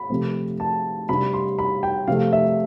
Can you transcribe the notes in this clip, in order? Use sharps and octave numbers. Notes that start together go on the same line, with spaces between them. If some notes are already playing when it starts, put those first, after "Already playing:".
Already playing: B5
C3 F3 A3 C4
A5
C3 G3 D4 B5
C6
B5
G5
C3 F3 A3 F5
E5